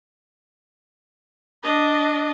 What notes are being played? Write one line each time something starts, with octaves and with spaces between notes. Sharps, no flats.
D4 D#5